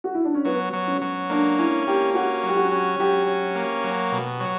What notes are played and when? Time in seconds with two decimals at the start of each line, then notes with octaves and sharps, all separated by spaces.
0.04 F#4
0.14 E4
0.25 D4
0.34 C#4
0.45 F#3 B3
0.73 F#3
0.87 C#4
1.01 F#3
1.30 A#3 D4
1.58 C#4 E4
1.87 A#3 G4
2.14 C#4 F#4
2.43 F#3 G4
2.56 F#4
2.71 C#4
3.00 F#3 G4
3.27 C#4
3.55 A#3
3.84 F#3
4.12 B2
4.40 F#3